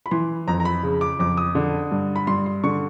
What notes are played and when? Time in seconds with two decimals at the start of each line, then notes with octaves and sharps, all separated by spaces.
0.06 B5
0.11 E3 C6
0.48 F2 A#5
0.60 A#5
0.65 B5
0.83 C#3
1.01 D6
1.19 F2 D6
1.37 D#6
1.55 D3
1.91 G2
2.16 B5
2.27 G2 C6
2.46 C6
2.64 D3 C#6